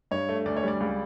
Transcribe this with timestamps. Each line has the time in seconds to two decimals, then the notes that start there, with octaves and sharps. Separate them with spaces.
0.11 G2 C#5
0.29 A3
0.46 D2 D5
0.57 C#5
0.64 G3 D5
0.80 C#2